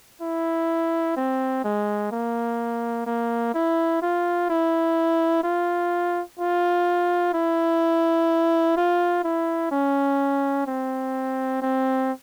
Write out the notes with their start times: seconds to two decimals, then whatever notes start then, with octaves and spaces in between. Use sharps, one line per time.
0.22 E4
1.17 C4
1.64 G#3
2.11 A#3
3.06 A#3
3.54 E4
4.02 F4
4.50 E4
5.44 F4
6.39 F4
7.34 E4
8.77 F4
9.24 E4
9.72 C#4
10.67 C4
11.62 C4